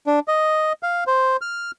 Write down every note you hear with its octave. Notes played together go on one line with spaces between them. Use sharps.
D4
D#5
F5
C5
F6